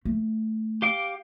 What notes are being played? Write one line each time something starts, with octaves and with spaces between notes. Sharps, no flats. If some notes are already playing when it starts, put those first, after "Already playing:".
A3
G4 F5 D6